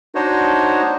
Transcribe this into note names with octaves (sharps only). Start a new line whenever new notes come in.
D4 D#4 F#4 C5 C#5 D#5